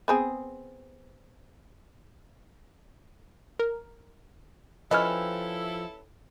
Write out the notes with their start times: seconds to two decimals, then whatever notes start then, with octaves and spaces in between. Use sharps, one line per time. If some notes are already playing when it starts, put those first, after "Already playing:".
0.08 B3 C4 G#4
3.59 A#4
4.91 F3 C#4 E4 G4 A4 B4 D#5 F6